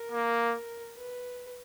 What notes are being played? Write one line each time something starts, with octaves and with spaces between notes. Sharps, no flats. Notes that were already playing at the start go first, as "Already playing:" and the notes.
Already playing: A#4
A#3
B4